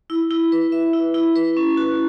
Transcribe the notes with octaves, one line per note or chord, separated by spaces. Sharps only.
E4
E4
B4
E5
E4
E4
B4
C#4
F#4